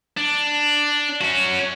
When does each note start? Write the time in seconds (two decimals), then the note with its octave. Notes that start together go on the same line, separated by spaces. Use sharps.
0.17 D4
1.21 C#4 F#4